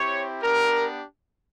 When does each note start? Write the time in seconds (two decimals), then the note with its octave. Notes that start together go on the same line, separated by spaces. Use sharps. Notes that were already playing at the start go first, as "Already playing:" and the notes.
Already playing: C4 E4 G4 C#5
0.42 B3 D4 G4 A#4